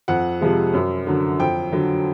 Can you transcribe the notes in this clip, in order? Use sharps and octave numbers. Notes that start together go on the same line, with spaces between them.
F2 F#5
C3 F3 G#3
F#2
D3 F#3
F2 G5
D3 F#3